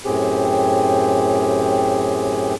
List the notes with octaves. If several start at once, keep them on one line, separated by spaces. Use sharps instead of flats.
F#2 A2 C4 G4 G#4